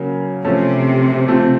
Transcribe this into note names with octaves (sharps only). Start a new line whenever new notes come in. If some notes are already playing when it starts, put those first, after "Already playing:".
Already playing: C#3 F#3 A#3
C3 F3 A3 C#4 A4
F3 A3 C4 F4 A4